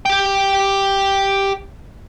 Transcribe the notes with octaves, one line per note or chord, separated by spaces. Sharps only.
G4 G5